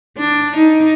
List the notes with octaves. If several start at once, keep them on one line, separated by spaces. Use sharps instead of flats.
D4
D#4